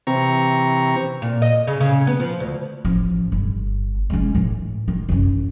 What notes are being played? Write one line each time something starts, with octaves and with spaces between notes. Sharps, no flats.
C3 E3 C4 A#5 C#6
A#2
D#5
C#3
C#3
B3
F3
D2
A1 F3
G1
G#3 C#4
A2 E3
D#3
A1 F#2